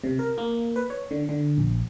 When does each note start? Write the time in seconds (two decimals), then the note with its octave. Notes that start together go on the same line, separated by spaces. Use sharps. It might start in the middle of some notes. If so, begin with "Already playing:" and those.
0.04 C3
0.19 A#4
0.38 A#3
0.76 B4
0.90 C#5
1.11 D3
1.29 D3
1.58 A#1